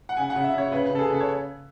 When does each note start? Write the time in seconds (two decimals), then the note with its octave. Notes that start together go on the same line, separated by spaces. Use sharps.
0.09 F#5
0.17 C#3 G#5
0.30 F#5
0.36 C#3
0.44 E5
0.53 C#3 C#5
0.71 C#3 B4
0.86 C#3 B4
0.95 A4
0.99 G#4
1.08 C#3 A4
1.21 C#5